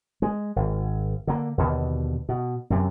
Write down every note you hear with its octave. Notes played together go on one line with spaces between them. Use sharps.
G#3
G#1
D3 A#3
D#2 B2 D3
B2
F#2 C3